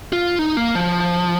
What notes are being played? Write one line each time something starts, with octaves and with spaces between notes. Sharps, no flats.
F4
D#4
A#3
F3